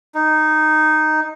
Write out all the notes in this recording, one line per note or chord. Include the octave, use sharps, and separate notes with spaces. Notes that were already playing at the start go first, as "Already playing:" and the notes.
D#4